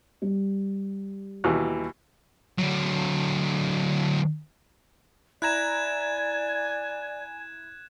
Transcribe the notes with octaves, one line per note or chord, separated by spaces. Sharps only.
G3
D#2 B2 E3
D3 F#3
E4 D5 G#5 A#5 F#6 G#6 E7